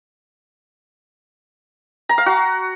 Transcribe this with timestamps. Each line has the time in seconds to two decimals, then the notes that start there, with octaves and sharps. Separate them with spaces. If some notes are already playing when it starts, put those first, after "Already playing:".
2.09 A#5
2.18 F5
2.26 F#4